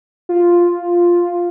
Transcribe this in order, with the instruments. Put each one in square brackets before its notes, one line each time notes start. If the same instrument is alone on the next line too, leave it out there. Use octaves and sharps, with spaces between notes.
[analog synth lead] F4